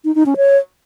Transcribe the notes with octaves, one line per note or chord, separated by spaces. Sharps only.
D#4
D#4
C#4
C#5